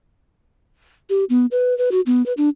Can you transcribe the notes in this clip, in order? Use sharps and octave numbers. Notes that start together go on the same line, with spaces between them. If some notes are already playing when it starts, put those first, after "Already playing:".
G4
B3
B4
B4
F#4
B3
B4
D4